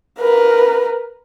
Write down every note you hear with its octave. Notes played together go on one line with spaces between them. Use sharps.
A#4 B4